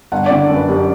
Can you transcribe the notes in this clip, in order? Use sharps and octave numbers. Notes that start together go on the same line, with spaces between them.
G1 F#5
D3 D5
F#2 B4
F#2 G4